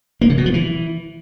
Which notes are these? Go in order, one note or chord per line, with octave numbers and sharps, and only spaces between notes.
A#3
C#3
B2
F3
E3